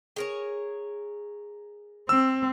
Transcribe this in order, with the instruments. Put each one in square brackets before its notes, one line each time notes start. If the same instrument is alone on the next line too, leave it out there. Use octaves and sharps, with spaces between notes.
[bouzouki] G#4 A#4 C#5
[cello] C4 [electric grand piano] E6